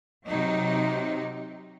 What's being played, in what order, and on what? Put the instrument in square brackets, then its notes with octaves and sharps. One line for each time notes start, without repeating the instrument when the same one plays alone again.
[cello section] C3 F#3 D#4